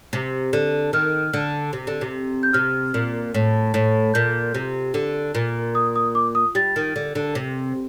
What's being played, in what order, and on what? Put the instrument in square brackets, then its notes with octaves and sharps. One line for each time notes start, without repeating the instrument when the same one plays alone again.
[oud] C3
D3
[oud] D#3 [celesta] F6
[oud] D3
C3
D3
C3
[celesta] G6
[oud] C3 [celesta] F6
[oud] A#2
A2
A2
[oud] A#2 [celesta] G6
[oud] C3
D3
A#2
[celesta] D#6
D#6
D6
D#6
[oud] G3 [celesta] A6
[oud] D#3
D3
D3
C3